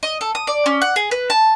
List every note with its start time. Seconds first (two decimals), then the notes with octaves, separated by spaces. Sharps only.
0.03 D#5
0.21 A4
0.35 D#6
0.47 D5
0.66 C#4
0.82 F#5
0.96 G#4
1.11 B4
1.30 A5